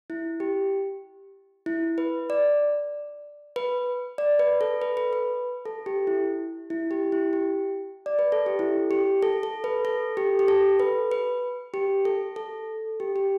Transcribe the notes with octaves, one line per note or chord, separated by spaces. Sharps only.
E4
G4
E4
B4
D5
B4
D5
B4
A4
B4
B4
B4
A4
G4
E4
E4
G4
E4
G4
D5
B4
A4
G4
E4
G4
A4
A4
B4
A4
G4
G4
A4
B4
B4
G4
A4
A4
G4
G4